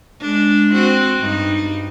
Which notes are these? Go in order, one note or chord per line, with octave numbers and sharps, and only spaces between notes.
G#3 D4
C4 F#4
G2 G3 D#4